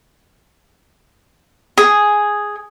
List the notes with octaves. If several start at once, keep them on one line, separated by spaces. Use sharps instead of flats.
G#4